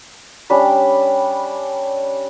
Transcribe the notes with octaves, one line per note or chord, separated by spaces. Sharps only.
G3 C#4 D4 B5